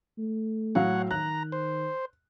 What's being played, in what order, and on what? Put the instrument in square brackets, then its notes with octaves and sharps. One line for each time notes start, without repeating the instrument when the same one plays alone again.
[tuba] A3
[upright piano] A2 F#3 F5 [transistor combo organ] C#5 F#5
[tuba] D#3 [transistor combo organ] A#5 [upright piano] F#6
[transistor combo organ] C5